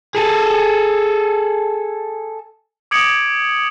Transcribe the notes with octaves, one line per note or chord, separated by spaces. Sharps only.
G#4 A4
D6 D#6 G#6 C#7 D7 F#7